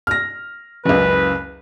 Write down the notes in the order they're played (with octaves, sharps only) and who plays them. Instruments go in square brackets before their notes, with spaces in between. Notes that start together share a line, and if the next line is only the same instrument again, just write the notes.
[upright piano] F6 A#6
[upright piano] F#1 C#2 [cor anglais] B4